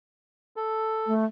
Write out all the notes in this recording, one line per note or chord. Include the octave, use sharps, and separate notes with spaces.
A4
A3